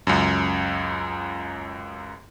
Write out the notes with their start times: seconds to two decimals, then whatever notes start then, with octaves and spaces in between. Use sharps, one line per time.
0.07 C#2 F#2